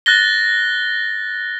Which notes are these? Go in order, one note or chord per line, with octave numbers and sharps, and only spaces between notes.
F#6 A6 A#6 G7